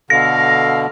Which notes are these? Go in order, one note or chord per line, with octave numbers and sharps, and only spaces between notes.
B2 D3 A4 F5 A#6